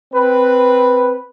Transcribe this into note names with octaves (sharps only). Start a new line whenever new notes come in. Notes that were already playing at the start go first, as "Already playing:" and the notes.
C4 B4